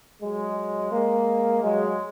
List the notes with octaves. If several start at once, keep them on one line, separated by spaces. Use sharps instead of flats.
F#3 G#3
G#3 A#3
F#3 G#3